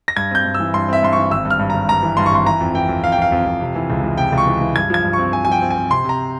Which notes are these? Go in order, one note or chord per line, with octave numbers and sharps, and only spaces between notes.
A#6
G2 G#6
C4 G6
G2
E6
E3
G2 C6
C4 E5
G2 C6
E3 C#6
G#1 E6
G2
F6
G2
G#1 A#5
G2 A#5
E3
G2 C6
C#6
G#1 C6
E3 A#5
F2
E3 G5
F2
F2 F5
G5
F2 F5
F2
F2
C3
E3
C#2
E3
C3 G5
C#2
C#6
E3
E3
G2 G#6
F3 G#6
G2
C4 C#6
C4 G#5
G#5
F3 G5
C4
G#5
C4
C3 C6
C3 A#5